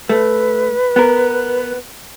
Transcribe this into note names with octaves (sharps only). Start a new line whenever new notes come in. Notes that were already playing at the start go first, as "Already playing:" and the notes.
A3 B4
B3 A#4